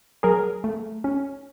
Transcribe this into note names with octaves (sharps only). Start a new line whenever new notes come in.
F#3 G#4 A#4
A3
C#4